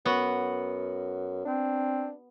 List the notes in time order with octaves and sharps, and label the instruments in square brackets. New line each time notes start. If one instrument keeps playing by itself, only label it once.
[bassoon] F#2 [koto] B3 F#4
[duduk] C4 [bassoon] D4